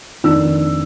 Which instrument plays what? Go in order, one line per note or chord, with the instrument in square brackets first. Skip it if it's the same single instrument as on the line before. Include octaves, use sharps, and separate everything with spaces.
[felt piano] F1 D#3 D4 E6